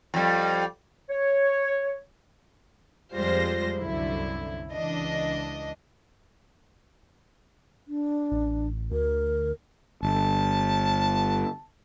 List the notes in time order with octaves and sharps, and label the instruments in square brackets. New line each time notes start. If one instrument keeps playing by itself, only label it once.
[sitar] F2 G3
[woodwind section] C#5
[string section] F2 G3 G#3 F4 C5 A#6
C2 F#2 D3 E4
C#2 E3 D4 D#5
[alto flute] D4
[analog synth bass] A1
[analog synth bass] D2 [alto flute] A#4
[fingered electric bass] G1 [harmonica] A5